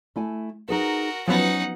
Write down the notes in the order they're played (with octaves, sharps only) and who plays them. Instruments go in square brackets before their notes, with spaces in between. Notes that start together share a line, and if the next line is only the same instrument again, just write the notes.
[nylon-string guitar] A3 E4 G#5
[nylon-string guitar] D#4 G#4 B4 [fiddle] F#4 A#4
[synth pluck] F3 F#3 B3 [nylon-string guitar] C#4 [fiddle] D#4 F#5